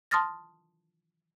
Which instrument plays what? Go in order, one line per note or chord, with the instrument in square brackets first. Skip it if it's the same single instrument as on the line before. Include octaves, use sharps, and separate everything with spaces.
[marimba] A5 C6 D#6 F6 A6 A#6